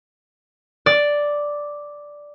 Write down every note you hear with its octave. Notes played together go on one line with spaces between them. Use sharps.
D5